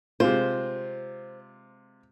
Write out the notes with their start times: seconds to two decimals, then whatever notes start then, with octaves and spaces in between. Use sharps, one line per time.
0.20 C3 G#3 F4 C5